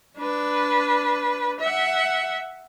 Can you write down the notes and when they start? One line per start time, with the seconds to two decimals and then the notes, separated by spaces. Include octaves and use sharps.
0.17 D4 B4
1.60 E5 F#5